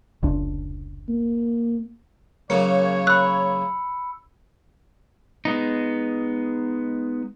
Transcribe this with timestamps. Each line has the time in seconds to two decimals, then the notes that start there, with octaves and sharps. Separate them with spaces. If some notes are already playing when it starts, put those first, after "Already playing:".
0.23 F1 C#2 D4
1.09 A#3
2.50 F#2 C#3 A#3 C#5 C#7
3.07 B5 E6 F#6
5.45 G#3 B3 D#4